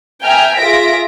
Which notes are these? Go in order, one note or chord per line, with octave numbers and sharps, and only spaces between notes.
E5 G5 G#5 A#5 F6
F4 G#4 E5 A#6 B6 D7